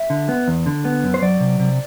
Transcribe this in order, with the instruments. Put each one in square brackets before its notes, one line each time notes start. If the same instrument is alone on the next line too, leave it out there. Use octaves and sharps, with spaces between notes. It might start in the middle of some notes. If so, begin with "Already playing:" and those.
Already playing: [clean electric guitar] E5
D3
B3
E2
D3
B3
F#2
C5
F#3 D5
C3
C3